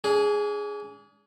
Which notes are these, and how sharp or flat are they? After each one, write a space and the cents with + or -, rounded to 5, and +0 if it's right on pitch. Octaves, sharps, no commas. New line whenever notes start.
D4 -45 G#4 +0